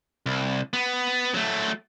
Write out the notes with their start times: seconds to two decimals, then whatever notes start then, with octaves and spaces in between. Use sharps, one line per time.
0.26 C2
0.73 B3
1.34 F#3 A3